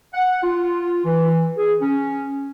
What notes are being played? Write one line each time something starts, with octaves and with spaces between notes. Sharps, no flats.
F#5
F4
E3
G#4
C#4